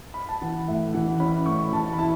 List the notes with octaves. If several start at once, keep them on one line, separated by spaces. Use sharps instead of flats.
B5
A5
E3 F#5
A2 E5
E3 F#5
C#4 B5
A2 C#6
E3 A5
B5
E4 A5